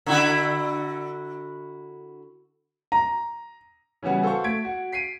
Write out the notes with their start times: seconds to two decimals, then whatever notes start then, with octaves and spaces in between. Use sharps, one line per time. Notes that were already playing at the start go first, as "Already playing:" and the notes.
0.06 D3 E4 F#4
2.92 A#5
4.03 C#3 E3 G3 B3 F#4
4.23 F#4 A4 C5 F5 C#6
4.44 A3 G#6 B6 D7
4.65 F#4
4.93 B6 C7 D7 D#7